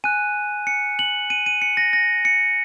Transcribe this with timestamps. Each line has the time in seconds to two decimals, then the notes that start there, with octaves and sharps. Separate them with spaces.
0.04 G#5 F#6 D#7
0.67 C#7
0.99 F#7
1.30 D#7
1.46 D#7
1.62 C#7
1.77 A#6
1.93 A#6
2.25 C#7